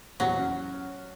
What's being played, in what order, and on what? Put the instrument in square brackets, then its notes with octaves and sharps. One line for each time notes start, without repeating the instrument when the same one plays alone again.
[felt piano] D#1 E2 F#4 [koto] F#3
[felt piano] C#4